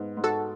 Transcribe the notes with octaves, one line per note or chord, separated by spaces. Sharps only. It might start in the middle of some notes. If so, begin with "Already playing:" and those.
Already playing: G#2 B3
G#2
F#4 A4